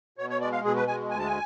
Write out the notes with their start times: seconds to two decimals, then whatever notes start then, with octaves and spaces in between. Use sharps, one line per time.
0.18 B2 C#5
0.30 C#5
0.41 G#3 D5
0.52 F5
0.64 B2 G#4
0.76 B4
0.87 G#3 G#5
1.10 D2 G#5
1.19 A5
1.26 G#5